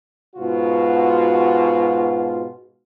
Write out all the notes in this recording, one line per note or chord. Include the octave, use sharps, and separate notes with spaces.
G#2 B2 F4 F#4